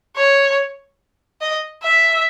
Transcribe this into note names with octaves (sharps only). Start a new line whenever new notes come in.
C#5
D#5
E5